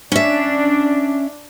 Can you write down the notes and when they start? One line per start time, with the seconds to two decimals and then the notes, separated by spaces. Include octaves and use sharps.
0.12 C#4 D4 E5